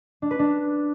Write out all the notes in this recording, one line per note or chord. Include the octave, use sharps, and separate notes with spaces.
D4
B4
D4